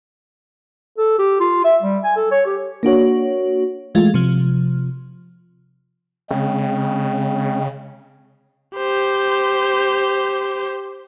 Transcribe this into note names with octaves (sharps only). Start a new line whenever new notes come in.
A4
G4
F4
E5
G3
G#5
A4
C#5
G4
A#3 D4 F#4 C#5
E3 G#3 A3 F4
C3 F3
C#3 G#3 C4
G4 C5